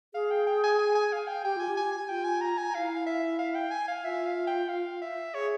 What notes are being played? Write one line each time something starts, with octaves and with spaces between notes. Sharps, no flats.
G#4 F5
G5
G5
G#5
G#5
G#5
F5
G5
G4 G5
F4 G#5
G4
G#5
G#5
F4 G5
G#5
A#5
G#5
E4 F5
E5
F5
G5
G#5
F5
F4 E5
F5
G5
F5
E5
G#4 C#5